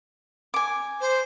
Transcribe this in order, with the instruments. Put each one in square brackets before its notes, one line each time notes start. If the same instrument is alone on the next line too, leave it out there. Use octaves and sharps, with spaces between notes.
[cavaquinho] G#5 D6
[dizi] C5